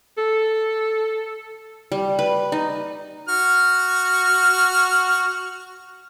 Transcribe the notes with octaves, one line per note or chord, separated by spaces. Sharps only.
A4
G3
B4
D#4
F#4 F6